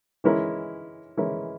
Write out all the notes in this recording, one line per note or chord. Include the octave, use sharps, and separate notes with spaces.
E3 G#3 C#4 E4 A#4
E3 G#3 C#4 E4 A#4